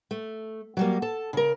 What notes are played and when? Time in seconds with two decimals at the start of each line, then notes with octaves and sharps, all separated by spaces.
0.11 A3
0.77 F#3 G3 A#3
1.02 A4 A5
1.33 C#3 A#4